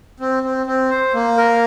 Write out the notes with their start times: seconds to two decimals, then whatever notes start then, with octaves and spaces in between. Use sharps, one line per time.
0.20 C4
0.43 C4
0.66 C4
0.90 C5
1.14 A#3
1.37 A#4